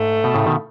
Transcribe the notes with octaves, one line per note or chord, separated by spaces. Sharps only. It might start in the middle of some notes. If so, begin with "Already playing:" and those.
Already playing: G#2 A3
B2
A2 C#3
B2 D#3